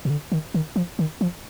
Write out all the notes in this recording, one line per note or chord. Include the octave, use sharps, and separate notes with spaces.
B2
D3
D#3
D#3
F3
D#3
F3